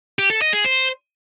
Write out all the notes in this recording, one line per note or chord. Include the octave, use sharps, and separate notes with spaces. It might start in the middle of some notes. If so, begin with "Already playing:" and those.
G4
A4
D#5
G#4
C5